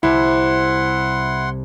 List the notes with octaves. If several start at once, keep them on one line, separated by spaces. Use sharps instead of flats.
C2 E4 F#5 C6